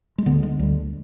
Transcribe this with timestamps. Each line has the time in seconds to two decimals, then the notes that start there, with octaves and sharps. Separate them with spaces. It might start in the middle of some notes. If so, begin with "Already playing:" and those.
0.18 G#3
0.26 D2 D3 B3
0.43 G#3
0.59 D2 D3 G3